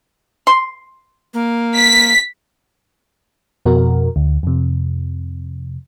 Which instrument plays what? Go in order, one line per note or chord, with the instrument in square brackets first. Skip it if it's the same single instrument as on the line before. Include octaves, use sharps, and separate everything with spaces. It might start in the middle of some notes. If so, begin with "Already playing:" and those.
[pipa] C6
[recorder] A#3
[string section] B6
[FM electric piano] F2 B2 F#4 A#4
D2
F2 C3